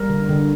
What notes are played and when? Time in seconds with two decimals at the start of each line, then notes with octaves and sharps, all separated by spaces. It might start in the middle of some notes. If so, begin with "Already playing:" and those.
Already playing: G3 A#4
0.09 D3
0.29 D3